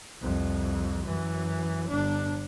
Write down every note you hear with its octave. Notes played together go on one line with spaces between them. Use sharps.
C2 F2
F#2 E3
G1 D4